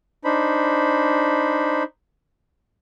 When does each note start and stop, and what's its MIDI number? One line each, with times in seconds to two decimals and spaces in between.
0.24 1.83 62
0.24 1.83 63
0.24 1.83 72
0.24 1.83 83